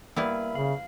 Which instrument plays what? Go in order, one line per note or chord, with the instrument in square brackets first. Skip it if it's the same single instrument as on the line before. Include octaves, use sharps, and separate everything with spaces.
[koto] G3 B3 E4 [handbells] A#3 A#4 B5 [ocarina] E5
[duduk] C#3 [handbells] F5